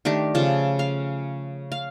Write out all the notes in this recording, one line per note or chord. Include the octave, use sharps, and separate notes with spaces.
D#3 A3 D4 G4
C#3 F3 A4
F5
F5